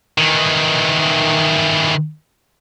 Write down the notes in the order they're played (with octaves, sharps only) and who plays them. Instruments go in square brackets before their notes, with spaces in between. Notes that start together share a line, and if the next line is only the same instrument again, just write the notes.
[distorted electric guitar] D#3 E3